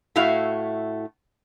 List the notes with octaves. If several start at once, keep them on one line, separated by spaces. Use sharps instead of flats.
A2 A3 E4 F#4 F5